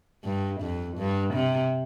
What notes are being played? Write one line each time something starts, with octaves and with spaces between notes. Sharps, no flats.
G2
F2
G2
C3